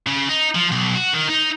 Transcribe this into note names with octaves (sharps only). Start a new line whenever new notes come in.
C#3
D#4
F3
B1
F#4
D#3
D#4